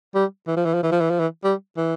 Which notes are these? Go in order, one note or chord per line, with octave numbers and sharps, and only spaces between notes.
G3
E3
F3
E3
F3
E3
F3
E3
F3
E3
G3
E3